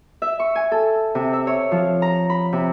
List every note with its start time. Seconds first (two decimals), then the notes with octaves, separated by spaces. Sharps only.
0.22 E5
0.40 C#6
0.55 G#5
0.72 A4
1.15 C3
1.33 E5
1.47 C#5
1.71 F3
2.02 A#5
2.30 B5
2.53 C3